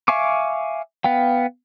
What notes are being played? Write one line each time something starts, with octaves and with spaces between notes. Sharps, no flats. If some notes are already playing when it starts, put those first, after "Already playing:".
E5 F5 G#5 C#6 D6
B3 F5 G5